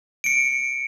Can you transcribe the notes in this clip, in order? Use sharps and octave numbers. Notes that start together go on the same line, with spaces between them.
C#7 D7